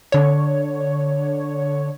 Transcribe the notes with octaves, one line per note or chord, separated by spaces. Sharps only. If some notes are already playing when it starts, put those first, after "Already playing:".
D3 C#5